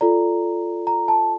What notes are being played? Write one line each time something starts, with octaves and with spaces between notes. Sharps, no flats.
F4 A4 D5 A#5
A#5
A5